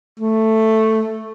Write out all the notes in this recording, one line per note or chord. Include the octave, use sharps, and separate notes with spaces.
A3